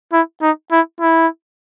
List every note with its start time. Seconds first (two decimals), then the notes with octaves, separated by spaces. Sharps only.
0.13 E4
0.42 D#4
0.72 E4
1.01 E4